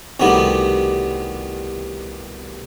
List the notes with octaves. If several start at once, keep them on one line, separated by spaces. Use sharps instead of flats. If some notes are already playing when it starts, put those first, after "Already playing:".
C2 B2 D#3 G3 A3 B3